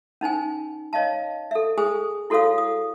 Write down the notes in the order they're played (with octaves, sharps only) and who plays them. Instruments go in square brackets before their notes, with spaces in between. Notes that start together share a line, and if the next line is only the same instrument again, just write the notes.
[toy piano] C#4 D#4 C5 G#5
C#5 D#5 F5 A5
A4 E5
G#4 C5 G#5 D#6
E4 F#4 A4 C#5 F5 D#6
D#6